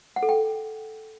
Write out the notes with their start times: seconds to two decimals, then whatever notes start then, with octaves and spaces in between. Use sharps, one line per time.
0.16 F#5
0.23 A4
0.29 G5